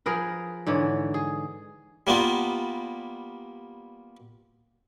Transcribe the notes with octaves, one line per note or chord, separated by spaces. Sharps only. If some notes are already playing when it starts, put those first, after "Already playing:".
F3 G#4 A#4 B4
G#2 D3 E3 C#5
G#4
G3 A#3 B3 F4